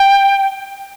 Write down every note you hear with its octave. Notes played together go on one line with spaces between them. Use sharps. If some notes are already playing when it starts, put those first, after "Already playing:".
Already playing: G5